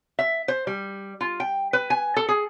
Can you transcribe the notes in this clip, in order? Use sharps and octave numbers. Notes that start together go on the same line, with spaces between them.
E5
C5
G3
F4
G5
B4
G#5
A4
G#4